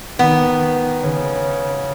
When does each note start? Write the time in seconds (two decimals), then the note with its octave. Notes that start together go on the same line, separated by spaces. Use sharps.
0.19 D#3 B3
1.03 C#3